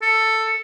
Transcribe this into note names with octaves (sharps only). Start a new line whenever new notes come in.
A4